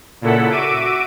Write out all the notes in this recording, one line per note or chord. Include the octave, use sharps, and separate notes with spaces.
A#2 C#3 E4 A4 F#5 B6
F#4 E5 D6 D7 D#7